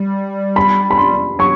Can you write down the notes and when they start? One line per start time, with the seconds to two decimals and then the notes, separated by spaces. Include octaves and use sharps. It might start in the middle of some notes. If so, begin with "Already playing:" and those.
Already playing: G3
0.56 B5
0.91 B5
0.97 C6
1.39 F#3 C#6